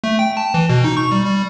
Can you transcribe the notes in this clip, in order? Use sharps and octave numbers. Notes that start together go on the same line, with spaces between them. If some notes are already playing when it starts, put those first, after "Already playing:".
A3
G5
A5
E3
B2
D#4
C#6
G3
G3